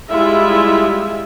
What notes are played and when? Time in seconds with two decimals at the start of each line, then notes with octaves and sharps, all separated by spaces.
0.10 G3 G#3 E4 F4 G#4 E5